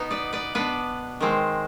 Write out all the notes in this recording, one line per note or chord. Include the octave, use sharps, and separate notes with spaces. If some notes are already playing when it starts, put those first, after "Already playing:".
Already playing: B2 B3 D#4
B4 D5
B4 D5
B2 B3 D4 B4 D5
D#3 G#3 C4